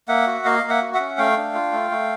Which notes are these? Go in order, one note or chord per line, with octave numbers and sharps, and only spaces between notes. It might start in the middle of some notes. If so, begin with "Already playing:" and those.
A#3 E5 F#5
F#4
A#3 D#5 F5
A#3
E5 F#5
F#4
E5 F#5
C#4
A3 F5 G5
D4
F4
A3
A3